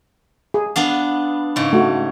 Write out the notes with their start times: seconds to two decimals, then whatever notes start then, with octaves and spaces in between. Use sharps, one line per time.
0.54 G#4
0.76 B3 D4 F5
1.56 G#2 C#3
1.73 A3 F#4